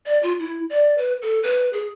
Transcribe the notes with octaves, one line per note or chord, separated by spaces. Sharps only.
D5
F4
E4
D5
B4
A4
B4
G#4